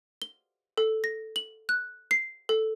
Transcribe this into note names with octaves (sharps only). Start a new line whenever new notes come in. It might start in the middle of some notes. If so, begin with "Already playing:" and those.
G7
A4
A#6
F#7
F#6
C7
A4